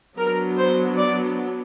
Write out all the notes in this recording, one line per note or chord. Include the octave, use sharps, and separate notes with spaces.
F#3 B3 D4 A#4
C5
D5